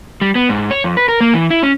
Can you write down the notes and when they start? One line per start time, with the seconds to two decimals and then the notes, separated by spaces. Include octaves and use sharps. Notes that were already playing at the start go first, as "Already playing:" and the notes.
0.21 G3
0.35 B3
0.49 G#2
0.71 C#5
0.84 F2
0.97 B4
1.08 A#4
1.21 A#3
1.34 E3
1.51 E4
1.63 C#4